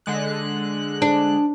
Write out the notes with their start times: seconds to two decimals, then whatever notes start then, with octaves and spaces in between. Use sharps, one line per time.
0.06 D3 G#3 F#6
1.02 D4